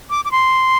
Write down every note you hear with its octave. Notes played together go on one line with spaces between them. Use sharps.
D6
D6
C6